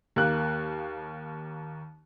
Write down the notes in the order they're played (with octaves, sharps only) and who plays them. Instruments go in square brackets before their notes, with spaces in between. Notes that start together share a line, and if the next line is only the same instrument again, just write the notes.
[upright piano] D#2 A#3 F#6